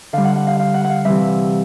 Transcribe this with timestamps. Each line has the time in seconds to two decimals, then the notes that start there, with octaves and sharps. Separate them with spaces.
0.13 D3 G3 F5
0.24 F#5
0.36 F#5
0.47 F5
0.59 F5
0.74 F#5
0.84 F#5
0.90 F5
1.05 C3 E3 G3 E5